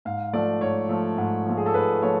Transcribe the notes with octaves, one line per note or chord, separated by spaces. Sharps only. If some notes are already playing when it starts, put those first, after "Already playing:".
G#2 F5
F3 A3 D5
G#2 C#5
F3 A3
G#2
F3 A3
G#4
A4
G#2 B4
F3 A3 C#5